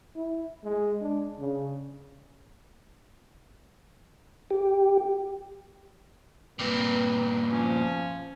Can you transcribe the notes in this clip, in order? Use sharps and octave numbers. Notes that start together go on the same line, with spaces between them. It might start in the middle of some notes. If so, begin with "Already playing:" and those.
E4
G#3
D4
C#3
G4
G2 A#2 C4 B4
F3 C#4